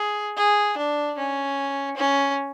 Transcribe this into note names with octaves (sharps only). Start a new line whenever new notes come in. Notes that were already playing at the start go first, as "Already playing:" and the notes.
Already playing: G#4
G#4
D4
C#4
C#4